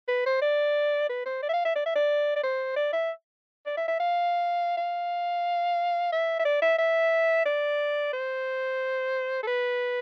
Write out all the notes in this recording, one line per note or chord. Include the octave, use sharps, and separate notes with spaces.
B4
C5
D5
B4
C5
D5
E5
F5
E5
D5
E5
D5
D5
C5
D5
E5
D5
E5
E5
F5
F5
E5
E5
D5
E5
E5
D5
C5
A4
B4